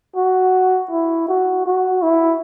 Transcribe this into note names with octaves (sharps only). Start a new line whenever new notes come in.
F#4
E4
F#4
F#4
E4